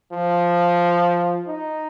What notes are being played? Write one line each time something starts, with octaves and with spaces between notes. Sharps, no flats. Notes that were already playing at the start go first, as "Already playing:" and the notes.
F3
D#4